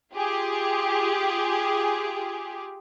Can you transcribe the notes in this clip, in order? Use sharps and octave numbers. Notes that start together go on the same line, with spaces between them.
F4 G4 G#4